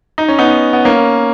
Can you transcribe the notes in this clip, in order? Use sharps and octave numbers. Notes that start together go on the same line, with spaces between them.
D#4
C#4
B3 D#4
B3
A#3 C#4